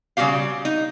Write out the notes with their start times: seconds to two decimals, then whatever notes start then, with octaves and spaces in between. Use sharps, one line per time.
0.17 C#3 G3 F#4 G4 F5
0.65 D#4